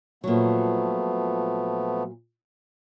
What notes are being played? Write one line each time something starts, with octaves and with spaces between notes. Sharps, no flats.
A#2 F3 F#3 A3 B3